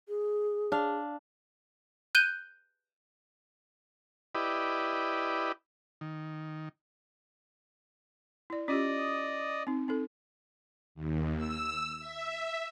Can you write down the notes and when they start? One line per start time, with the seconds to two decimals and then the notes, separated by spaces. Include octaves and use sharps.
0.08 G#4
0.72 D4 F5
2.15 F#6 G6 D#7 G7
4.35 E4 G4 B4 D5 D#5
6.01 D#3
8.50 E4 D5
8.68 C#4 F4 G4 D5 D#5 D#6
9.67 C4 D#4
9.88 C4 D#4 A4
10.95 D#2
11.37 E6
12.00 E5